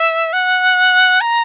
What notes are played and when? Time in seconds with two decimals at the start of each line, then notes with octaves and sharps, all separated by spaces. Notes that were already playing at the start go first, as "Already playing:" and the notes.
Already playing: E5
0.33 F#5
1.21 A#5